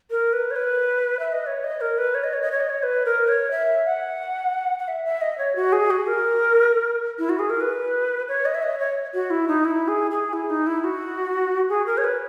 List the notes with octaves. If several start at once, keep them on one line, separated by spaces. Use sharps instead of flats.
A#4
B4
C#5
B4
E5
D#5
C#5
D#5
A#4
B4
C#5
D#5
C#5
D#5
C#5
D#5
C#5
B4
A#4
C#5
E5
F#5
F#5
E5
E5
D#5
C#5
F#4
G#4
F#4
A#4
E4
F#4
G#4
A#4
B4
C#5
D#5
E5
D#5
C#5
F#4
E4
D#4
E4
G#4
G#4
E4
D#4
E4
F#4
G#4
A#4
C#5
B4